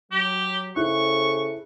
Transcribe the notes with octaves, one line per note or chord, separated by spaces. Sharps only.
F#3 G4
C#3 E4 G#4 A4 C5 C#6 F#6